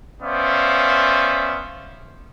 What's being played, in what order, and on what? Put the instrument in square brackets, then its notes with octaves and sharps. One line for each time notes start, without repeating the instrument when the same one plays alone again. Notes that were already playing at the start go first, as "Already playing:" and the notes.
[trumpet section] B3 C#4 C5 D5 E5 F5